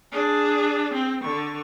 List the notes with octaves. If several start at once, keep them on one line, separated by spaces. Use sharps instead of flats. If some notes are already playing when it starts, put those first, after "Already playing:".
D4 G#4
C4
D3 C#6